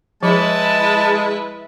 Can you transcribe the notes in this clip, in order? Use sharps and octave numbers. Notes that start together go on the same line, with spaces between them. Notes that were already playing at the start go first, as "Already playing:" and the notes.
F3 G#3 E4 B4 A5